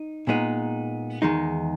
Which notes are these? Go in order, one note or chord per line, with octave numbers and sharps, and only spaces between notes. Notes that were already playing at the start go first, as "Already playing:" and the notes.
Already playing: D#4
A#2 G#3 B3 D#4
E2 D#3 G#3 D#4